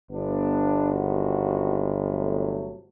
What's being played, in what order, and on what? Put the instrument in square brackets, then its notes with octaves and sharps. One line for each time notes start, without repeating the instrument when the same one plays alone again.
[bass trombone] G1 [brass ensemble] B3 D4
[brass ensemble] G#1 F#4
C3 F#3 A3